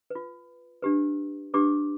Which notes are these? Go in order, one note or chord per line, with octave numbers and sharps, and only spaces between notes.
F4 B4
D4 G4 B4
D4 G4 B4 D6